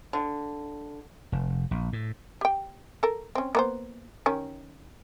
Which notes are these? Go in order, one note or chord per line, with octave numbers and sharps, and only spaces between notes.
D3
F1
A#1
A2
G4 G5
A4 A#4
C4 C#4
A#3 B3 C5
D#3 C#4 G4